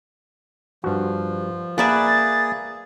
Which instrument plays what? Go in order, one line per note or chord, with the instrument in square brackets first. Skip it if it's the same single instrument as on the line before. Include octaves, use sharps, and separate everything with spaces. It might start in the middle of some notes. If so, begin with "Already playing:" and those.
[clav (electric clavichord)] G2 F#4 [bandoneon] F3
[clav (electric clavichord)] A#3 A#4 F#5 [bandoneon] G#4 [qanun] B4 D5 E5 [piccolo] A6